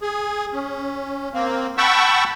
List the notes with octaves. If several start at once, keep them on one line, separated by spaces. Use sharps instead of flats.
G#4
C#4
A#3 C4
F#5 G5 A5 B5 C#6 E6